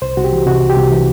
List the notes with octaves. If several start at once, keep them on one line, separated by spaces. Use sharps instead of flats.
C2 C5
C2 F#4
G4
E3
C3 F#4
C2
G4
C2
E3